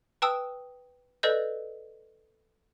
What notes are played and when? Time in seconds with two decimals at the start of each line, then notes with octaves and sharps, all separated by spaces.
0.22 B4 G5 A5 D#6 E6
1.23 A4 B4 D5 D#5 G6